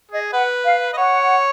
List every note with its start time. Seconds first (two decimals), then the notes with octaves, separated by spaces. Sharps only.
0.11 G#4 D#5
0.32 B4 F#5
0.65 F5
0.93 D#5
0.97 C#5 F#5